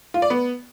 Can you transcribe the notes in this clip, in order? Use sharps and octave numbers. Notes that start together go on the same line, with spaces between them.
F4
D5
B3